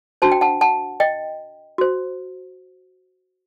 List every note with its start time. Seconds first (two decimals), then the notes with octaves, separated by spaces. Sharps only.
0.22 D4 F#4 C5 A5
0.32 G5
0.41 F#5 A5
0.61 F#5 A5
1.00 D#5 G5
1.78 F#4 C5